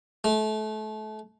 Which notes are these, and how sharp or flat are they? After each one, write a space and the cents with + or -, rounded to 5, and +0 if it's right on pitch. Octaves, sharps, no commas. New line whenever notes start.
A3 -30